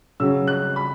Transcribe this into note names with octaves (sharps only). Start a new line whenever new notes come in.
C#3 F#3 C#4 E6
F#6
B5